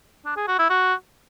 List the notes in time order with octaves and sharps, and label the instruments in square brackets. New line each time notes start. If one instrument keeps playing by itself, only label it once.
[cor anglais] D4
G#4
F#4
E4
F#4